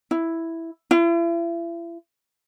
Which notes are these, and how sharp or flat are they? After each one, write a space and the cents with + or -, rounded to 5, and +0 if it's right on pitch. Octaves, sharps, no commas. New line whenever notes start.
E4 +0
E4 +40